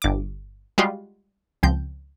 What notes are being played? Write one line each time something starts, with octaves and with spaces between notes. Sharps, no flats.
G1 D6
G3 G#3 F4 F#4
C#2 F3 C4 G6